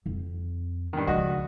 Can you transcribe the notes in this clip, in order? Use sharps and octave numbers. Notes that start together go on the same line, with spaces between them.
F2 C4
G2 D#3
C#2 F3 F#4 D#5